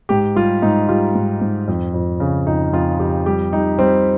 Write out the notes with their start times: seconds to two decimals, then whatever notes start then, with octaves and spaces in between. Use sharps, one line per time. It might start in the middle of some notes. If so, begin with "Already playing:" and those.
0.09 G#2 G4
0.36 G3 F4
0.62 G#2 D#4
0.89 G3 F4
1.15 G#2
1.41 G#2
1.68 F2
1.94 F2
2.20 C#3
2.47 F2 D#4
2.73 F2 F4
2.99 F2 G4
3.26 G3 G4
3.53 G3 D#4
3.79 G3 C4